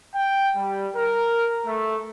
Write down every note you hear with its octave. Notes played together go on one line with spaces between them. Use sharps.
G5
G3
A#4
A3